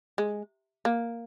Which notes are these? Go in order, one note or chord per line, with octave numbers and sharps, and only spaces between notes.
G#3
A#3